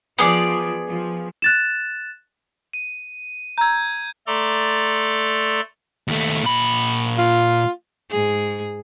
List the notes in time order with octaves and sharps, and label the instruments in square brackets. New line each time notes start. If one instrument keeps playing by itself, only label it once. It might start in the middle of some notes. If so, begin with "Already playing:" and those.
[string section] F3 [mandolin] B3 G#4 D5
[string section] F3
[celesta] F#6 A6 E7
[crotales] D#7
[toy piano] A#5 E6 [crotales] G6 G#6
[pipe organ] A3 A4 D5 A#5 C6 D6
[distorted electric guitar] D#2 A3
A#2 B5
[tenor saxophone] F4
[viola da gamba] G#2 G#4